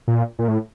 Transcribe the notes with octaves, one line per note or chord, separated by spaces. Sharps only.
A#2
A#2
A2